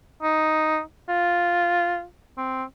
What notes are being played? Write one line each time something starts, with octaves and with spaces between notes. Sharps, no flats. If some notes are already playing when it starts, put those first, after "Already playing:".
D#4
F4
C4